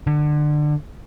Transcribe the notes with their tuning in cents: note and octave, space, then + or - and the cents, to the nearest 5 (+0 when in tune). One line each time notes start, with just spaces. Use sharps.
D3 +25